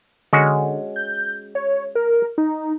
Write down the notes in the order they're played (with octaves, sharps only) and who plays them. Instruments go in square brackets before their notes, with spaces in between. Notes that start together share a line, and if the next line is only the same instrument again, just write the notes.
[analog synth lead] D3 [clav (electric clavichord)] G#3 C#4 F#4
[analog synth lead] G6
C#5
A#4
D#4